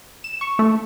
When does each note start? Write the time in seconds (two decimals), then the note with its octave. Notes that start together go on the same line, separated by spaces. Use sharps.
0.24 E7
0.41 C#6
0.59 A3